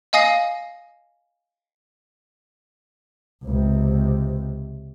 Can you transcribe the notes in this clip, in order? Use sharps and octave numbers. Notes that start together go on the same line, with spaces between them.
D#5 F5 G#5 D#6 A#6 C7
C#2 C3